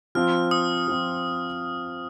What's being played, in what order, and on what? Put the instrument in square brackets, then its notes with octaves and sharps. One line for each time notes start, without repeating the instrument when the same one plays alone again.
[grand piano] F3 C4 F4 [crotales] F6
[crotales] D#6
[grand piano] F3 C4 F4